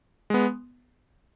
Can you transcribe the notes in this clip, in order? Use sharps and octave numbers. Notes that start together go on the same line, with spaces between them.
G#3 B3